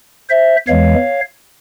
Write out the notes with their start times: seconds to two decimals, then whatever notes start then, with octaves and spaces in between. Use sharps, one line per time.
0.30 C5 E5
0.67 E2 E3 G#3 C#5 F5